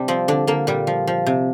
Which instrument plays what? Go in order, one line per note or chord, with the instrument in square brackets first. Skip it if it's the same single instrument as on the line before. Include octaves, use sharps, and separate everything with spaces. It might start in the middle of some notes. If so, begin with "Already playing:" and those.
Already playing: [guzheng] C3 G3 D4
F3 C4
D3 D4
D3 A#3
A#2 G3
F3
F3
C3